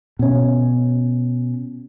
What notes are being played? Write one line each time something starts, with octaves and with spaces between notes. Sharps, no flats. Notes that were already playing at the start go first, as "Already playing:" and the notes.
B2 C#4